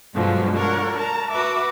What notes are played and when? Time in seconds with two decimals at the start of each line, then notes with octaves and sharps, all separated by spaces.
0.14 G2 B2 D3 F3 F#3 G#3
0.56 D4 A#4 C#5 F#5
0.97 A5 A#5
1.31 F#4 B4 E5 D6